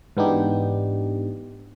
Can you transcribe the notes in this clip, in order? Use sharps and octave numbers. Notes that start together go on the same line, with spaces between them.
G#2 E3 B3 D4 D#4 G4